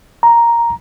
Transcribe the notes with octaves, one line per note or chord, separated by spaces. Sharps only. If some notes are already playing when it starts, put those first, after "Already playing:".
A#5